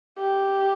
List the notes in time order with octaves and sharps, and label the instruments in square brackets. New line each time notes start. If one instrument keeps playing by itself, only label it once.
[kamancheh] G4